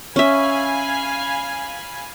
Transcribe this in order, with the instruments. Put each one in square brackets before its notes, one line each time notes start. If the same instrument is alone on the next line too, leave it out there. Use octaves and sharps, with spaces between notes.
[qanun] C#4 E5 [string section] F5 G#5 B5